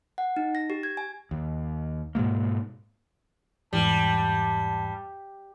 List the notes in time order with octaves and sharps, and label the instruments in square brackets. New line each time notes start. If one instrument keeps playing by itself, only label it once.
[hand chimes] F#5
D#4
A#6
G4
G#6
G#5
[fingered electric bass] D#2
G#2 B2 G#3 A#3
[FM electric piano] E2 G#2 E3 [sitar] G3 [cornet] A5